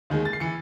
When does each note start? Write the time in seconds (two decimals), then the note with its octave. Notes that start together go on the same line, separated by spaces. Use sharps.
0.10 D#2 D#3 G#3
0.25 A6
0.33 C7
0.40 E3 C#7